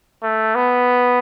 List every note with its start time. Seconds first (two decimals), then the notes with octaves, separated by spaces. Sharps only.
0.23 A3
0.55 B3